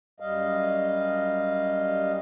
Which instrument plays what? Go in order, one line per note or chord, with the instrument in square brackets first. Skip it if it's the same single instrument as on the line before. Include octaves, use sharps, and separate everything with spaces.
[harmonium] F#2 G3 D#5 F5